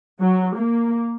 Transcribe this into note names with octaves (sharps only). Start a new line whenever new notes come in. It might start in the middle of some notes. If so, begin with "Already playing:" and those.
F#3
A#3